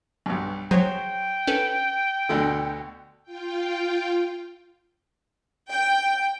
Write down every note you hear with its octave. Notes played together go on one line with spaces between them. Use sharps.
B1 G2
F#3 G#4 C5 C#5 G5
C#4 A4 B4
D2 B2 D3
F4 G5
G5